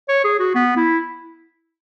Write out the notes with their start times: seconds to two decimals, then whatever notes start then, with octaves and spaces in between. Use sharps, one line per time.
0.09 C#5
0.25 G#4
0.40 F#4
0.55 B3
0.76 E4